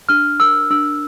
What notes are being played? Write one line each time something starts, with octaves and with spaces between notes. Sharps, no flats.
D4 F6
A#4 E6
D4 E6